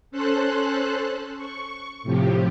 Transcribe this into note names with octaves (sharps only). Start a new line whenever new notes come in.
C#4 A4 C5 C6 F#6
C#6
A2 C3 F3 G4